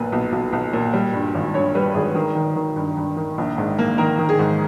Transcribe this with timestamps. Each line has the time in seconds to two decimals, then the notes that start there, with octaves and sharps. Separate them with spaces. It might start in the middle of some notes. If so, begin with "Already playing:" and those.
Already playing: B1 A#2 B4
0.12 B1
0.32 B1
0.53 B1
0.73 A#2
0.93 G3
1.13 G2
1.35 G#1
1.54 G2 C#5
1.75 G3 B4
1.94 G#1 G#4
2.15 D#3 A#4
2.35 D#3
2.56 D#3
2.76 G2
2.97 G2
3.16 D#3
3.38 A#1
3.58 G#2
3.78 A#3
3.98 D#3 A#4
4.19 D#3
4.29 G#4
4.39 G#2